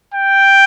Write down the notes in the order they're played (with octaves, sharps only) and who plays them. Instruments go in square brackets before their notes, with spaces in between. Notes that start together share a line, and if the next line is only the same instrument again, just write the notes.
[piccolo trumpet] G5